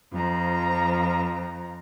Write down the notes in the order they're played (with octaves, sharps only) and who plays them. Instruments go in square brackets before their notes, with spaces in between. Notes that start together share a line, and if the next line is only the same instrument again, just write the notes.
[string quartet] F2 F3 A#5